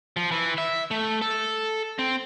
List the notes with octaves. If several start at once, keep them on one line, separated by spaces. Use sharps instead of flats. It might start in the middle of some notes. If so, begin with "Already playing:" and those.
F3
E3
E5
A3
A4
C4